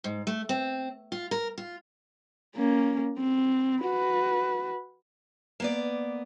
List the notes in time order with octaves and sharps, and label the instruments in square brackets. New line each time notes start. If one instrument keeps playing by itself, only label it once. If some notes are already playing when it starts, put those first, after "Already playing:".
[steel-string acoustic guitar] G#2
A3
C4
F4
A#4
F4
[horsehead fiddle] A#3 C#4
C4
F#4 B4
[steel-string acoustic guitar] A#3 B3 D5